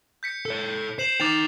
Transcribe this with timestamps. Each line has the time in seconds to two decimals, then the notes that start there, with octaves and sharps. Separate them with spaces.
0.23 G6 B6 C#7
0.46 A4 C#5
0.99 C5 C7 E7 F#7
1.20 D#4 G5 D6 A6 F7